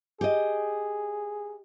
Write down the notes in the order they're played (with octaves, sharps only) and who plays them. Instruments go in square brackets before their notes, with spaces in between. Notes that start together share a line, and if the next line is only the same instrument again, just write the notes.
[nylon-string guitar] G4 D#5 [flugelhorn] G#4